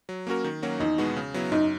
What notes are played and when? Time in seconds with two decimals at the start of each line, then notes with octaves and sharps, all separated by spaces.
0.09 F#3
0.27 A#3 C#4 F#4 A#4
0.44 D#3
0.63 F#3 A#3 C#4 F#4
0.80 E2 D#4
0.98 B2 G#3 B3 F#4
1.17 C#3
1.34 F#3 B3 E4
1.52 F#2 D#4